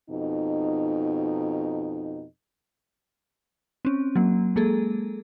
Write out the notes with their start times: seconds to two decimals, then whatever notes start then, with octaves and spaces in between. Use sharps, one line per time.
0.10 F2 B2 D#4
3.85 C4 C#4
4.16 F#3 A#3
4.56 G#3 A#3 G#4 A4